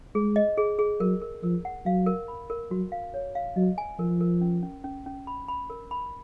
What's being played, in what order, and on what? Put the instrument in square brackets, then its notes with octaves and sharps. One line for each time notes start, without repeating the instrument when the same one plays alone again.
[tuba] G#3 [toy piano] G#4
[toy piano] D#5
G#4
G#4
[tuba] F#3 [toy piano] A#4
[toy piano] A#4
[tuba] F3 [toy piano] A#4
[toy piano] F#5
[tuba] F#3 [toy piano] F5
[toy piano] A#4
B5
A#4
[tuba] F#3 [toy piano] F#4
[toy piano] F5
C#5
F5
[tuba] F#3 [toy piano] D#5
[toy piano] G#5
[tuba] F3 [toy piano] A#4
[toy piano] A#4
C#4
C#4
C#4
C#4
B5
B5
A#4
B5